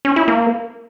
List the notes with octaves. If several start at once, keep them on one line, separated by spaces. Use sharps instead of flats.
C#4
E4
A#3